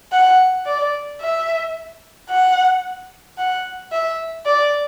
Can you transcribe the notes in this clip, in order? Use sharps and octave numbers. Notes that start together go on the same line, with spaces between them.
F#5
D5
E5
F#5
F#5
E5
D5